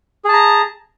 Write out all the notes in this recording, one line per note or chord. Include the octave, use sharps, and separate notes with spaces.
G#4 A5 A#5